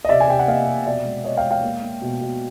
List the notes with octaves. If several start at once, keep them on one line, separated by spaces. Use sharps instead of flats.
D#5
C3 D5 E5
G#5
C3 G5
F#5
A#3 D#5 F5
C3
B2 D5 E5
G#3
B3 C#5 D#5
F5 G5
G#3
F5 G5
A#3
A#3
B2
B2